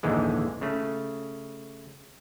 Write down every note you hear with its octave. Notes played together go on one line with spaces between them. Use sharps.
A#1 D#2 G#2 D3 E3 G#3
C#3 A3